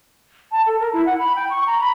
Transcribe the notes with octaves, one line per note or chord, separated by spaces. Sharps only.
A5
A4
A#4
E4
F#5
B5
G5
C#6
A#5
B5